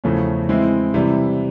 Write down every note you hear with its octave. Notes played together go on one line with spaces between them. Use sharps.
E2 C#3 F3 A3 C#4
E3 G#3 C4 E4
C3 E3 G3